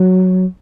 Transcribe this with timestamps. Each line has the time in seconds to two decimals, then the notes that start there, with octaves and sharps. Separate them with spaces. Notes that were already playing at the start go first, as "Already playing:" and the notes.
Already playing: F#3